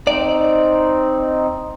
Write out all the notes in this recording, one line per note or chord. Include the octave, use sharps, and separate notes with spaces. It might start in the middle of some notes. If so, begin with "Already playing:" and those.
C4 D#4 D5